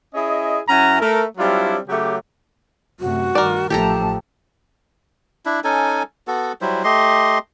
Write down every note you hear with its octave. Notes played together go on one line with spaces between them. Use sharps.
C#4 E4 G#4 D#5
F#2 C#4 E4 F#5 G#5 A#5
A3 A#4
F#3 G3 C4 D4 E4 F4
C#3 F#3 A3 G4
F#2 C3 A3 F#4
G2 D#3 A#4 D5
A1 F3 A3 G4 A4 A5 A#5
D4 E4
C#4 D#4 A4 G#5
B3 F#4 A4
F#3 G3 E4 C5
A3 G4 D#5 C6